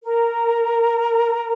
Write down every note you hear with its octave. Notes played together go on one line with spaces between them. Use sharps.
A#4